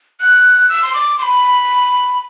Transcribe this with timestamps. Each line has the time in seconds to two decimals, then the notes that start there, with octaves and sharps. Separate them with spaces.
0.20 F#6
0.69 E6
0.83 C6
0.93 D6
1.18 C6
1.22 B5